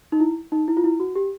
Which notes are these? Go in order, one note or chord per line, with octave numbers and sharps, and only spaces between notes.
D#4
E4
D#4
E4
F4
E4
F#4
G4